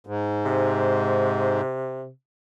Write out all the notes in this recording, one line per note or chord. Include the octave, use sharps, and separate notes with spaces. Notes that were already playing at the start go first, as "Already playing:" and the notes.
G#2
C3